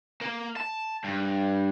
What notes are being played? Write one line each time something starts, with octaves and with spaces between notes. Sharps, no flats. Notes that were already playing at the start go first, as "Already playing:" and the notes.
A#3
A5
G2